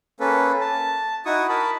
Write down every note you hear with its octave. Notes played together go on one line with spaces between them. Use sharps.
A#3 C#4 A4 B4
A5
D#4 E4 F#4 C#6 D#6
A#4 A5 B5